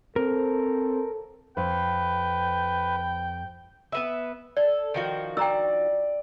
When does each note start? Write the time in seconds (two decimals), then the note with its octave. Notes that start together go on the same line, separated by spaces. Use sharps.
0.16 C4 A4 A#4
1.57 F2 B4 G5
3.92 B3 B4 E5
4.57 A4 D5
4.94 D#3 F3 F#4
5.37 D5 G5 A#5 E6